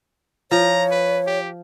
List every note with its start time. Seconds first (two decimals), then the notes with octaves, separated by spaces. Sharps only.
0.51 F3 C#5 A#5
0.91 B4
1.27 G4